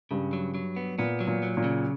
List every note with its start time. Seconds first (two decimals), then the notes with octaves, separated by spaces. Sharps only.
0.11 G2 C#3
0.33 F#3
0.54 F#3
0.76 B3
0.99 A#2 B3
1.20 F#3
1.27 A#2
1.43 F#3
1.57 A#2
1.64 C#3